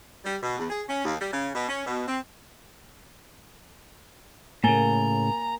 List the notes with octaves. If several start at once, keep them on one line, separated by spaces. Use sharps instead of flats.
G3
B2
E2
G#4
C#4
D#2
G3
C#3
B2
C#4
B2
C4
A2 C#3 A#3 G#5 A#5 A6 G7